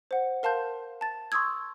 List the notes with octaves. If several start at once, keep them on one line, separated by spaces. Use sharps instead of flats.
C5 F#5
A#4 F5 A5 C6 G6
A5 A6
C6 C#6 D#6 E6 G#6